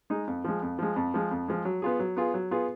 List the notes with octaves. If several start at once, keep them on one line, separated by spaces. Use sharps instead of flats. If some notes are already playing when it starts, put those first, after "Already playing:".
G#3 D#4
F2
F3 G#3
F2
F3 G#3
F2
F3 G#3
F2
F3 G#3
F#3
B3 F4 G#4
F#3
B3 F4 G#4
F#3
B3 F4 G#4